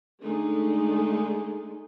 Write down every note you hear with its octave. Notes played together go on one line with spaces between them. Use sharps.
D3 G#3 A3 D#4